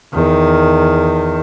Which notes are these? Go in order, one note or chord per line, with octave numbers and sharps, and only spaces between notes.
E2 D#3